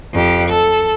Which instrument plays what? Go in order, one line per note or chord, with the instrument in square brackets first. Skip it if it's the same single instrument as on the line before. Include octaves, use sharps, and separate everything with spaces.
[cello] F2 G4
A4